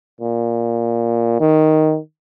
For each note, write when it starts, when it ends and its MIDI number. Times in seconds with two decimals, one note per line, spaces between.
0.21 1.39 46
1.40 1.99 51